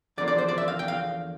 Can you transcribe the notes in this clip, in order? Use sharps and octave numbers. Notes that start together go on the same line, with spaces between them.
E2 D3 F3 A#3 D5
D5
C5
D5
E5
F5
G5
F5